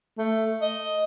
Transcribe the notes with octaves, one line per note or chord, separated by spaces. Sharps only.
A3
D#5